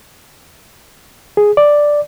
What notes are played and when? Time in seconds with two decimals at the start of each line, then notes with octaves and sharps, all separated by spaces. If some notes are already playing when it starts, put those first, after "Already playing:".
1.37 G#4
1.57 D5